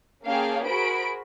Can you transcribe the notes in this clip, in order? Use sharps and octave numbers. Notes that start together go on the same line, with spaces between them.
A#3 C#4 G#4 F5 G5 A5
F#4 G#4 A#4 C5 B5 D7